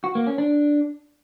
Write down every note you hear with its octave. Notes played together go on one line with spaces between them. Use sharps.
F#4
A#3
C#4
D4